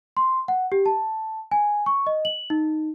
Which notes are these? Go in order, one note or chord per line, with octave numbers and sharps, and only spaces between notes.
C6
F#5
G4
A5
G#5
C#6
D#5
F#7
D#4